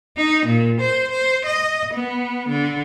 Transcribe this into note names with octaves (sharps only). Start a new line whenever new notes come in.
D#4
A#2
C5
C5
D#5
B3
D3